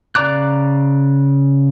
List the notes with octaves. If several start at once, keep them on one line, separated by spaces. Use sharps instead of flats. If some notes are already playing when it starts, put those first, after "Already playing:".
C#3 D5 A#5 D6 F#6